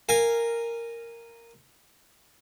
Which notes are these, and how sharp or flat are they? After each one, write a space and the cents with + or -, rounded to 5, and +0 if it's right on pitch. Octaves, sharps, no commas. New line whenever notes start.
A#4 -5 F5 -10 G#5 -15